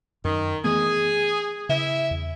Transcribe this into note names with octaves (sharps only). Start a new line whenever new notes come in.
F#2 D#3
E3 A3 B3 G#4
C#3 E4 E5
E2